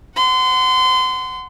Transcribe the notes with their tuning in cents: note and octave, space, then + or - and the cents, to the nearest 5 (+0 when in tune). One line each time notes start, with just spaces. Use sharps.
F#5 +0 C6 -30